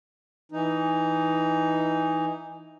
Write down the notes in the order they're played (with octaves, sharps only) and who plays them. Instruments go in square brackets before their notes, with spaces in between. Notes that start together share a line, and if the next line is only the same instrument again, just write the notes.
[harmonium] E3 D#4